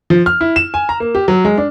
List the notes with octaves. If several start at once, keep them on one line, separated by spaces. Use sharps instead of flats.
F3
F6
E4
E7
G#5
A#5
A#3
G4
F#3
G#3
D4